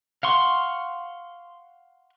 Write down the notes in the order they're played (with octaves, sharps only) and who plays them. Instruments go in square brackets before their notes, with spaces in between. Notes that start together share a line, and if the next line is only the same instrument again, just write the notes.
[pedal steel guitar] F5 F#5 C6 C#6